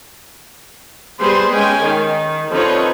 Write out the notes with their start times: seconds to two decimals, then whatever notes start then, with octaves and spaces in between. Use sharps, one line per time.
1.21 G3 B3 G#4 B4 C5 C6
1.52 G#3 C#4 G5 G#5
1.82 D#3
2.51 D3 F3 C4 D#4 B4 C#5